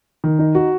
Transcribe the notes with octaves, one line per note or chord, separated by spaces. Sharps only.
D#3
D#4
F#4